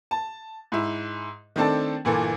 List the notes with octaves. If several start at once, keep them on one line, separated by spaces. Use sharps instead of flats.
A5
G#2 E4
D#3 A3 C4 D4 A4 A5
G1 A#2 E3 A4